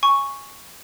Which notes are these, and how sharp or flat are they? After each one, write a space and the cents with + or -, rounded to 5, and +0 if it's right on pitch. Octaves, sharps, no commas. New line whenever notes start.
G#5 +0 C#6 +0